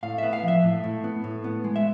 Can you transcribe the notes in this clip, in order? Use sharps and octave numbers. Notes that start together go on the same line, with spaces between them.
A2 F5
B3 E5
F5
F3 E5
A2
A2
B3
A2
B3
G#3
E5